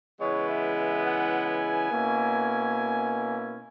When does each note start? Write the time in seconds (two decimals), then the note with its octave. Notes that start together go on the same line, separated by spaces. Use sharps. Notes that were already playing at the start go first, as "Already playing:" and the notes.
0.20 C#3 E3 G#3 B3 E4 C#5
0.48 E5
0.76 E5
1.05 F#5
1.47 G#5
1.90 B2 A#3 C#4 E4